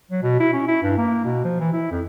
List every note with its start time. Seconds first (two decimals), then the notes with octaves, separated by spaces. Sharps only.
0.11 F#3
0.23 B2
0.40 E4
0.53 C#4
0.67 E4
0.83 G2
0.97 A#3
1.25 B2
1.44 F3
1.60 E3
1.73 E4
1.91 F2